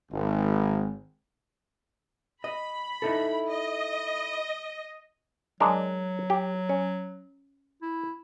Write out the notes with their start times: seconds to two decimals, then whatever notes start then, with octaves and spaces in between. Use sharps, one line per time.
0.11 G#1
2.44 D#5 B5
3.02 D#4 E4 A4
3.48 D#5
5.60 F#3 G#3 D4 A#4
6.30 G4
6.69 C#4
7.82 E4